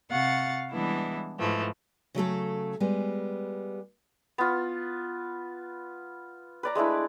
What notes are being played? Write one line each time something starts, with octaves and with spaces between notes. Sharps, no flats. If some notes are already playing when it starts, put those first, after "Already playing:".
C3 F5 F#5 C#6 A6
E3 G3 G#3 B3 D4 E4
G#2 E3 F3 A3
C#3 F#3 A3 A4
G3 G#3 B3
B3 F4
B4 D5 A#5
G#3 A3 D4 E4